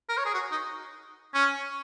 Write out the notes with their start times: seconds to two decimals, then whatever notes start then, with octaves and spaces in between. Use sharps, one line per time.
0.09 A#4
0.17 C#5
0.25 G#4
0.34 F#4
0.51 D#4
1.34 C#4